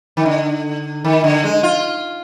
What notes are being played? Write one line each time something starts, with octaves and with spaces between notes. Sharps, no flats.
D#3
D3
D#3
D3
G#3
F4